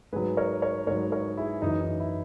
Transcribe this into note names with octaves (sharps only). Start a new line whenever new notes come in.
G#2 F#3 G#4 B4
A#4 C#5
A#4 C#5
G#2 F#3 A#4 C#5
A#4 C#5
E4 G#4
F#2 E3 D#4
D#4
E4